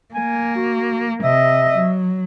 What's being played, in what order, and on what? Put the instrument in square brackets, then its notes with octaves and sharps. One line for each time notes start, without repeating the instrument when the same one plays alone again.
[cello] A#3 [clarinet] G#5
[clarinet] F#4
[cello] C3 D#5 [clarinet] E5
[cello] F#3